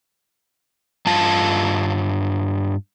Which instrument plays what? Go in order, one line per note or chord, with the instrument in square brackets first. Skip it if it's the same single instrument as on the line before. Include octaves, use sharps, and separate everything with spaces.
[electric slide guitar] G2 F4 A5